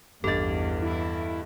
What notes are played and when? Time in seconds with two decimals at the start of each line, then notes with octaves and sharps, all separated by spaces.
0.24 A1 E2 G2 A4 D#5 A6
0.83 E4